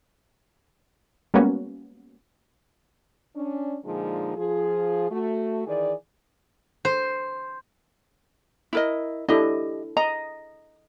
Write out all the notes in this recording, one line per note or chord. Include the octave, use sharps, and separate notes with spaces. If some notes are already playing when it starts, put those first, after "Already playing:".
G3 G#3 A#3 B3 C#4 F#4
C#4 D4
A#2 D3 F3 G#3 D#4 G#4
F3 F4 G#4
A3 F#4
D#3 E3 G#4 D5
C5
E4 A#4 D#5
D4 E4 G4 A4 D#5
D#5 A#5